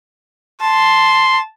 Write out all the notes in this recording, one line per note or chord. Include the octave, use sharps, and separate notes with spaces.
A5 C6